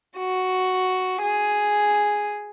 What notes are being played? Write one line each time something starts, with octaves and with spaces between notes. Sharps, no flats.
F#4
G#4